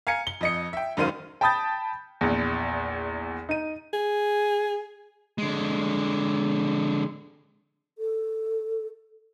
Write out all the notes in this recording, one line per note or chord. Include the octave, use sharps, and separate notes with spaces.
F5 G#5 A#5 G#6 C#7
G7
F2 D#5 C#7
E5 G5
E1 F#2 D#3 C5 F5 D#7
G5 A5 B5 D#6 G6 A6
A#1 E2
D#4 D#7
G#4
D3 G#3
A4